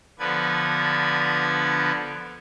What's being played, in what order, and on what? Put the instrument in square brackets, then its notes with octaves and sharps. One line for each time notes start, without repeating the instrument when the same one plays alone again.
[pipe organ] D3 F3 B3 B4 D5 G#6